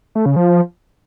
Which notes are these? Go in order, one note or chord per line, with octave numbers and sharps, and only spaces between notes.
A3
C#3
F3